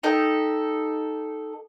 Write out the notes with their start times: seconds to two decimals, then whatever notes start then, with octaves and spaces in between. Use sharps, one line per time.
0.03 D#4 G4 A4